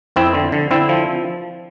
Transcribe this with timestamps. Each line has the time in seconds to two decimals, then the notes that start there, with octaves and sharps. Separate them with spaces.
0.16 F2 C4 E4
0.34 D3
0.52 D3
0.71 D3 C4 E4
0.89 F3